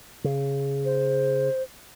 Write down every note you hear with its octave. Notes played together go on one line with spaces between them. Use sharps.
C#3
C5